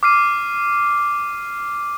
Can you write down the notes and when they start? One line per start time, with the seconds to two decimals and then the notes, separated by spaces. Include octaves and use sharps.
0.03 D6 F6 C7 D#7